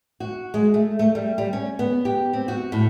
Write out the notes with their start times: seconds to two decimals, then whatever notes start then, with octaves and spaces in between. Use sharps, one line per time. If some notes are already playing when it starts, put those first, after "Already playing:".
0.20 F#4
0.54 G#3
0.74 A3
0.99 A3
1.15 G3
1.38 G3
1.53 C#4
1.79 B3
2.05 G4
2.33 C4
2.48 F#4
2.72 A2